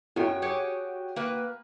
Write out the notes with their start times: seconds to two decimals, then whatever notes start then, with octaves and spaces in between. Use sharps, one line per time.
0.16 F#2 F#4 C#5 G5
0.42 G4 G#4 C#5
1.16 A#3 B4